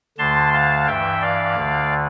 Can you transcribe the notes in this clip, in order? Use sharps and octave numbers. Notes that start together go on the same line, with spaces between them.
D2 D3 A5 C6
F5 A5
G2 E3 E5 G5
D5 F5
D2 D3